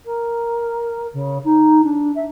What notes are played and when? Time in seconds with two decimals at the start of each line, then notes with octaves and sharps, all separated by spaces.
0.05 A#4
1.13 C#3
1.44 D#4
1.84 D4
2.15 E5